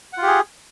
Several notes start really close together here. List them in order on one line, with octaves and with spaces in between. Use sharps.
F#5 F4 G4 G#4